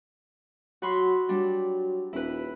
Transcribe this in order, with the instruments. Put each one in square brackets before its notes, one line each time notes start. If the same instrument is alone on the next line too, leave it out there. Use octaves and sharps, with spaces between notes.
[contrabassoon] F#3 [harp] F#4 B5 C6
[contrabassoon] F#3 [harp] G3 D4
[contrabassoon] D#1 [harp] E4 B4